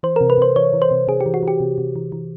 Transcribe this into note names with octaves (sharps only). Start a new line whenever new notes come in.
E3 C5
C3 A#4
B4
C3 C5
E3 C#5
E3
C5
C3
C3 G#4
G4
E3
F#4
E3 G4
C3
C3
E3
E3